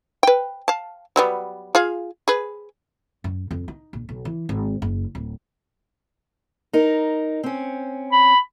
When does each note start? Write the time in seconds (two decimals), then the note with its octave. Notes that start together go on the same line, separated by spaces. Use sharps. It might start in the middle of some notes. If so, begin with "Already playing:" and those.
0.23 B4 G5
0.68 F5 A5
1.16 F#3 G3 B3
1.75 F4 G#4 F5
2.28 G#4 B4
3.24 F#2
3.51 F2
3.68 D#4
3.93 A#1
4.09 B1
4.25 E3
4.49 G#1
4.82 F#1
5.15 D1
6.73 D#4 A#4
7.44 C4 C#4
8.12 B5